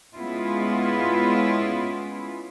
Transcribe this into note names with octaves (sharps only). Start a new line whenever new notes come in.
G#3 B3 C#4 E4 F4